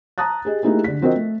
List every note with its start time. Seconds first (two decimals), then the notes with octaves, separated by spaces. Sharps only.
0.18 A5 A#5 D#6 F#6 A6
0.45 G4 G#4 D#5
0.63 A3 A#3 D#4 E4 G4 G#4
0.84 D3 B6
1.01 F3 C4 F#4 A#4 D#5
1.16 A3